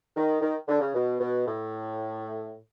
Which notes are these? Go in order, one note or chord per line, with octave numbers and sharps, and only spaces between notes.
D#3
D#3
D3
C#3
B2
B2
A2